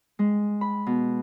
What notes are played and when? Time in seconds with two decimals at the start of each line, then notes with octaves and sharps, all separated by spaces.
0.19 G#3
0.61 B5
0.86 B2